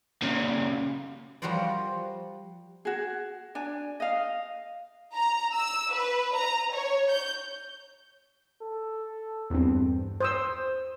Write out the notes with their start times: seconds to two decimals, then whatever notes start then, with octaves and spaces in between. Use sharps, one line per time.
0.22 A#2 C#3
1.42 F3 G3 F#4 A#4 C5 D5
2.85 F#4 G#4
3.55 D4 G#5
4.00 D#5 F5
5.16 A#5
5.55 E6
5.94 B4
6.35 A#5
6.74 C#5
7.11 G6
8.62 A4
9.50 E2 G2 C4
10.21 C5 D#6 E6